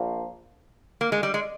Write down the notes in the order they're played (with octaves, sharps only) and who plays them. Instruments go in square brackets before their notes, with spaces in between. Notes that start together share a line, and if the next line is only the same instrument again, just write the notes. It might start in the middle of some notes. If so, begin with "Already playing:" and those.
Already playing: [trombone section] A#1 F3 A#3
[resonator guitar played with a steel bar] A#3
G#3
G3
G#3